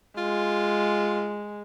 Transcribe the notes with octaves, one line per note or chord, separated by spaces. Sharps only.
G#3 F4